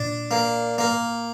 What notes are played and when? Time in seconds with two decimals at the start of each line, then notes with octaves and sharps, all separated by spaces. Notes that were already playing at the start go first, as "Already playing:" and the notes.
Already playing: A#2 D4
0.31 A#3
0.78 A#3